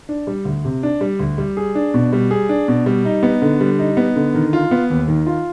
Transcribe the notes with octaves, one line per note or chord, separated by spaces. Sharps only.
D4
G3
D2
C3
D4
G3
D2
G3
G#4
D4
B2
G3
G#4
D4
B2
G3
D#4
B3
D3
G3
D#4
B3
D3
D#3
F4
B3
D#2
D#3
F4